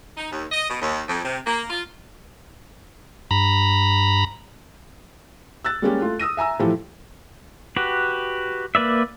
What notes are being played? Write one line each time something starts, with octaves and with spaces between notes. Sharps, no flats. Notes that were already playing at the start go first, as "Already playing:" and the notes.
D#4
D#2
D#5
B2
D#2
F2
C3
A#3
F4
G2 A#5 B5
E6 F#6 A6
G3 G#3 A#3 C#4 G4
A3 F4
D#6 E6 A#6 D#7
E5 G#5 A#5 E6
A2 E3 F3 E4 G4 A4
F#4 G4 B4
A#3 B4 D5 E5